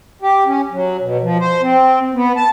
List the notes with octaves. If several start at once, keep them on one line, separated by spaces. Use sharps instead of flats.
G4
C#4
F#3
B2
F3
C5
C4
B3
A5